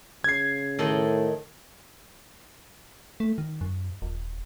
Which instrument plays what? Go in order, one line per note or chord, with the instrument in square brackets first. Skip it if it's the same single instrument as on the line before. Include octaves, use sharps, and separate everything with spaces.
[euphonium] C#3 [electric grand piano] G#6 C7
[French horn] A2 [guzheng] D#3 A4 D#5
[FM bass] A3
D#3
F#2
D#1